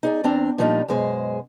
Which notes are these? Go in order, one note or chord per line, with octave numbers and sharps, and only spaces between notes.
D#4 G#4 D5
E2 C4 D4 A#5
A#2 F3 G3 D4 D#4
F#2 B2 G#3 G#4 C5